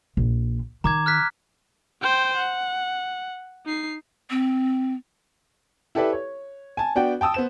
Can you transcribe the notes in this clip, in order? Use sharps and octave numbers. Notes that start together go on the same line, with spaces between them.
A#1
D#3 A#5 D6 G#6
F6 F#6 B6
C5 G5
F#5
D#4 C7
C4
E4 G4 A4 B4 D5 E5
C#5
G#5 A5
B3 D4 F#4 D5 G5
G5 A5 D#6 E6
B3 C5 E7